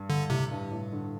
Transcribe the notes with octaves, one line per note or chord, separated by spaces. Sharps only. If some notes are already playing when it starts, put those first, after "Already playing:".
Already playing: G2
D3
A2 C3
G2
A2
D3